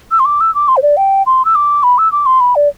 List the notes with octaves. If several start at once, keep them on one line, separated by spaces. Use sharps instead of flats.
E6
C6
D6
E6
D6
C6
C5
D5
G5
C6
E6
D6
B5
E6
D6
C6
B5
D5